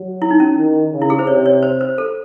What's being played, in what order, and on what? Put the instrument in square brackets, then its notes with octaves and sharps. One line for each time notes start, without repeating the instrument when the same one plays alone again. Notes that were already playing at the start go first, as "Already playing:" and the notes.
Already playing: [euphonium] F#3
[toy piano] E4
D#4
C#4
[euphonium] D#3
C#3
[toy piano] E4
G#4
C5
[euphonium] C3 [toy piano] C#5
[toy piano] C#5
C5
C5
A4